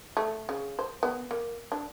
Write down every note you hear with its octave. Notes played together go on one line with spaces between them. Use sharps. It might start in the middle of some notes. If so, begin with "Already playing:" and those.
A3
C#3
C5
B3
A#3
D4